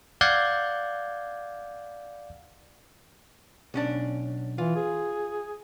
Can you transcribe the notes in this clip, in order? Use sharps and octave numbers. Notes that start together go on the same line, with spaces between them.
D5 F5 F#5 G6 G#6
B1 C#4 D4
E3 F4
G#4